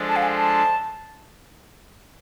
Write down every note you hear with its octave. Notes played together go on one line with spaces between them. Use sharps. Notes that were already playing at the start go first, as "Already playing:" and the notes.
Already playing: F3 G#3 D4 A4 C5
A5
F5
G#5
A5